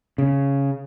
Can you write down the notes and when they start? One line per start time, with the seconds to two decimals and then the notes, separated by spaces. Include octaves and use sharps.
0.18 C#3